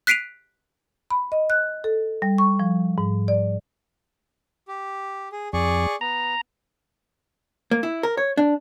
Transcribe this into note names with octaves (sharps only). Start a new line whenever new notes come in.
F#6 B6 C7 D7 D#7 F7
B5
D#5
F#6
A4
G3
C#6
F3
G#2
D5
G4
G#4
F2 G#4 D5 C#6
B3 A#5
A#3
E4
A#4
C#5
D4